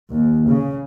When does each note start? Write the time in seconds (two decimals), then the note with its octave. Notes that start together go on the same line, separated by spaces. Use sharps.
0.13 D#2
0.48 C#3